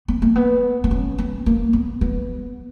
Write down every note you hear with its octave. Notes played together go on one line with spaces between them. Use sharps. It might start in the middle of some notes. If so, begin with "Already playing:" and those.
B3
A#3
B3
B3
C#4
B3
A#3
B3
B3